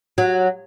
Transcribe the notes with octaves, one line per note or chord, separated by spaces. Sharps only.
F#3